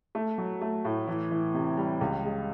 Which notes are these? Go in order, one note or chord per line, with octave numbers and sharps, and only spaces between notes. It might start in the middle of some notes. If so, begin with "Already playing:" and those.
A3
F#3
A3
A2
E3
E3
C3
G3
C#2
G#3